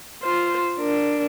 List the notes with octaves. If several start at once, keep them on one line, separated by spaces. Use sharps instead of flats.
F4 C5
D4 A#4